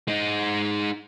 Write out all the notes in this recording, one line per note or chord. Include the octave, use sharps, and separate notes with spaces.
G#3 D#4